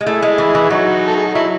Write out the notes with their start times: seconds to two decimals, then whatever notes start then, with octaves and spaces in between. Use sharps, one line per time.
0.01 G#3
0.07 A3 E4 G#4
0.22 G#3
0.38 E3
0.55 E3
0.70 F#3 D#4 F#4
1.07 A4
1.16 G#4
1.26 F#4
1.35 F#3 E4